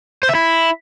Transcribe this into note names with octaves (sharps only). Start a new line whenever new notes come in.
C5
E5
E4